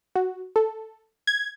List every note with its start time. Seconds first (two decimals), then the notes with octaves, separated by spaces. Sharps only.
0.16 F#4
0.56 A4
1.27 G#6